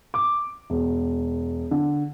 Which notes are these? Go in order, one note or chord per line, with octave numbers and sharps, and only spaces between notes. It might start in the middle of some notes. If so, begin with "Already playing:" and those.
D6
E1
D3